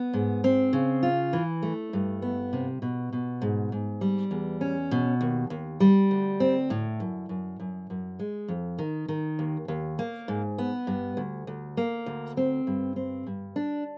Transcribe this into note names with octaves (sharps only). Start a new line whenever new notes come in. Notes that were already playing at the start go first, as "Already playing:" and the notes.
Already playing: B3
G#2
C4
C#3
F4
E3
A3
G2
B3
C3
B2
B2
G#2
G#2
G3
E2
C#4
B2
D#2
D#2
G3
D2
C4
A2
F#2
F#2
F#2
F#2
G#3
F2
D#3
D#3
D#2
D#2
A#3
G#2
B3
G2
D2
D2
A#3
D2
C4
G2
C4
G2
D4